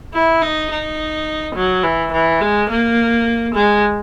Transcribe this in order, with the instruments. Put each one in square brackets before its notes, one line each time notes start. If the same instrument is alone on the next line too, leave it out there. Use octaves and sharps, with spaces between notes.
[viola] E4
D#4
D#4
F#3
E3
E3
G#3
A#3
G#3